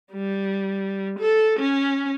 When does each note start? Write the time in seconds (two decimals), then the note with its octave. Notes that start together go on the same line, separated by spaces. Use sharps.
0.13 G3
1.19 A4
1.59 C#4